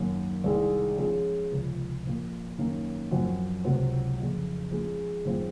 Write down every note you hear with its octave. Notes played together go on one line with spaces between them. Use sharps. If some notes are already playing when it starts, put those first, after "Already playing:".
Already playing: F#2 D#3 A#3
C2 C3 D#3 G#3
F3 G#3 C#4 F4 G#4
C#2 C3 F3
A#2 F3 A#3
F#2 D#3 A#3 C#4
F#2 F3 C4 F#4
C#2 C3 F#3 C4 F#4
F2 C#3 F#3
F3 G#3 C#4 G#4
F#2 D#3 G#3 C4 F4